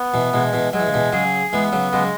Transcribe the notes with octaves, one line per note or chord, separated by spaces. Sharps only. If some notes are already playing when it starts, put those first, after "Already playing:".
Already playing: B3
B2 E3
B2 E3 G#3
B2 E3
F#3 G#3
E3
C#3
B2 E3
C#3 F#3 G#4
E3 G#3 B3
C#3 F#3
C#3 F#3 G#3